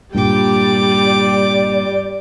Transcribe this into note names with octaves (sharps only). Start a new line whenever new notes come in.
G2 A#2 G3 G5 D6
D5